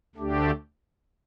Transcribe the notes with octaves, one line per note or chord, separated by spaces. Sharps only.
D2 D3 A3 D4 G4